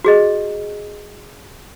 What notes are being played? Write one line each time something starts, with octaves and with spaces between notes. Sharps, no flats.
F#4 G#4 D#5